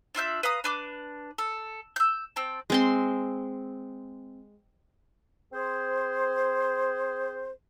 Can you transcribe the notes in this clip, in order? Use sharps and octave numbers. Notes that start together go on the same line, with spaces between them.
D4 F4 E5 G6
B4 F5 A#5 D#6
D4 B4 D6
A4
E6 G6
C4 G5 A5
G#3 C4 C6
C4 G#4 C5